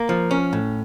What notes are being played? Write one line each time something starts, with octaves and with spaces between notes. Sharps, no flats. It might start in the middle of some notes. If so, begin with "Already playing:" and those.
Already playing: A#3
F3
C#4
A2